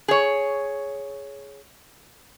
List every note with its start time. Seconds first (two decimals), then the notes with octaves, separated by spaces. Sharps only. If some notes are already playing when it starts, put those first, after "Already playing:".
0.08 G#4 C#5